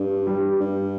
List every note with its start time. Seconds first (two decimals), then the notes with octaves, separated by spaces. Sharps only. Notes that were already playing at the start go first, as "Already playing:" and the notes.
Already playing: G2
0.27 G3
0.60 G2